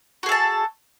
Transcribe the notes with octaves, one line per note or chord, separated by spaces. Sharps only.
F#4 G#4 A4 A5